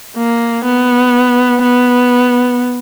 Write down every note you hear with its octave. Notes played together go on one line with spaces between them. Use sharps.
A#3
B3
B3